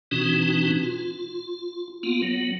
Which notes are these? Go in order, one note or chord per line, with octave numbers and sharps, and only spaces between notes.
B2 E3 C4 D4 D#4 F#4
F4
A#3 B3 F4
F#3 B3